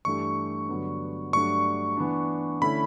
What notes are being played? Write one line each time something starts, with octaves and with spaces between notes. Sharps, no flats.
G2 E3 A3 D4 G4 C#6
G2 D3 F#3 B3 D4
G2 F#3 A3 D4 C#6
E3 B3 D4
D3 A3 C#4 E4 B5